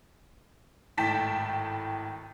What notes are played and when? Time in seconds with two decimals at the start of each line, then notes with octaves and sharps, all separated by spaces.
0.98 G#1 A2 G5 A5 B6